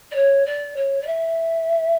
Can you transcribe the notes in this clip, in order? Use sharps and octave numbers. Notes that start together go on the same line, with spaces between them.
D5
C#5
D5
C#5
D5
E5